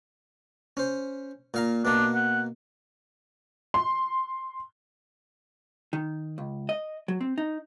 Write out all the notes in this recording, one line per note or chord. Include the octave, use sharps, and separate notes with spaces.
C#4 C5
A#2 F5 A#5
B2 A#3 D4
F#5
C6
D#3
C#2
D#5
F#3
C4
D#4